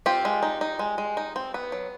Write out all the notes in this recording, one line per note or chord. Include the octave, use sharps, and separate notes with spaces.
C4 F4 G4
G#3
D#4
D#4
G#3
G#3
D#4
C4
B3
F#3